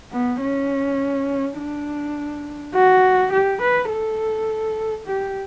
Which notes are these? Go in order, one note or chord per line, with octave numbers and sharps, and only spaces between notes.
B3
C#4
D4
F#4
G4
B4
A4
G4